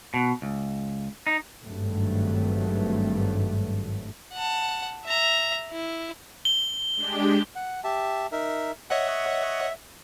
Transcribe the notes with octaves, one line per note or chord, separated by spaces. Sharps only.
B2
C#2
D#4
G#1 G2 F#3 A3
F#5 A5
E5 A#5
E4
G7
G#3 D4 G4
F#5
G4 E5 A5
D#4 A#4 E5
C#5 D#5 E5 F#5